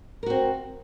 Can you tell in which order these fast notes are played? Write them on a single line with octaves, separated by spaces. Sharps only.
A#4 F#4 C4